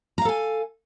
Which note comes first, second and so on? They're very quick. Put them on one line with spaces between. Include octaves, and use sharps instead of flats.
A#5 F5 A4 G#5